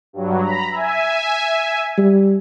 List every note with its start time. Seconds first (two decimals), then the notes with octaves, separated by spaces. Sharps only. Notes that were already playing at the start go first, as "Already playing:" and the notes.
0.13 G2 F#3
0.42 A#5 B5
0.71 E5 G#5
1.98 G3